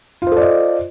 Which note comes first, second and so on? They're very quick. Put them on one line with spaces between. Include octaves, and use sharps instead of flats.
F4 C5 A4 D5 D#5